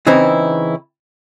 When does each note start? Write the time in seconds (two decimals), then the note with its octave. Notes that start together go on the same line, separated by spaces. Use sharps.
0.07 C#3 E3 C4 D#4 E4